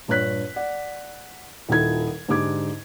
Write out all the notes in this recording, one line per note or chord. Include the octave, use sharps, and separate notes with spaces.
A#1 G2 C#5 F#6 B6
D5 F#5
D#1 A#2 D#3 E4 A4 G#6
G#2 D3 G4 D6 G#6